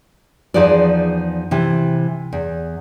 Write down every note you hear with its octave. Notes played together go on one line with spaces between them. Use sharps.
E2 F3 D#4 G#4 B4 D5
C3 E3
E2